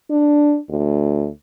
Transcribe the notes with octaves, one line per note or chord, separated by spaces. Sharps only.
D4
D2